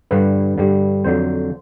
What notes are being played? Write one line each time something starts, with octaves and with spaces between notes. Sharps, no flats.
G2 D3 G3 B4
G2 D3 G3
F2 D3 F#3 C5